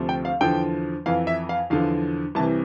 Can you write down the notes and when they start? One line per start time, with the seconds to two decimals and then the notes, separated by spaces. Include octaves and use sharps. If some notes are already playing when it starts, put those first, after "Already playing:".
Already playing: D2 C3 F3
0.09 G5
0.25 F5
0.41 E2 D3 F3 G5
1.06 F2 E3 F5
1.27 E5
1.49 F5
1.70 E2 D3 F3 F5
2.35 C2 C3 E3 A5